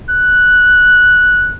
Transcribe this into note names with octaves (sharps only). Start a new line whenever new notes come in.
F#6